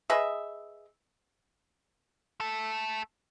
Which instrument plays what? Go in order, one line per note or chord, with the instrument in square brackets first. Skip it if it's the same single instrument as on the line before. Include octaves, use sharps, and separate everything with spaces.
[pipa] G#4 B4 D#5 E5
[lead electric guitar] A3 A4